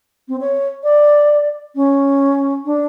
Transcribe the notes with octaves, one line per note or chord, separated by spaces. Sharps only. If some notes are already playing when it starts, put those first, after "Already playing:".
C4
C#5
D5
C#4
D4